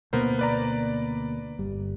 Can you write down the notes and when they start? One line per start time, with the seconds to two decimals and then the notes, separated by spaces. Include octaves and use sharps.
0.13 D2 B2 A#3 B3 A#4 C5
0.39 B4 D5 A#5
1.59 G1 G3